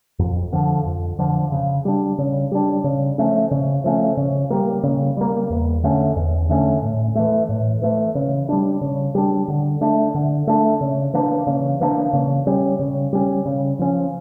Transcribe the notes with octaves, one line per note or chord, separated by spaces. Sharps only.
F2
D3 F3
F2
D3 F3
C#3
G3 D4
C#3
G3 D4
C#3
F3 A3 C#4
C#3
F3 A3 C#4
C#3
G3 A#3
C#3
G3 A#3
E2
D3 A3 C#4
E2
D3 A3 C#4
A2
E3 A3
A2
E3 A3
C#3
G3 D4
C#3
G3 D4
D3
A3 D4
D3
A3 D4
C#3
E3 A#3 D4
C#3
E3 A#3 D4
C#3
G3 C#4
C#3
G3 C#4
C#3
F3 C#4